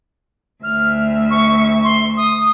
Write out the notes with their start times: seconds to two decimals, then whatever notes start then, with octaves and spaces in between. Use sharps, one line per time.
0.63 D2 E5 F6
1.30 C#6
1.84 C6
2.17 D#6